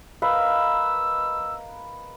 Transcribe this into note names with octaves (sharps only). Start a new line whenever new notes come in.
A#4 B4 D#5 F5 E6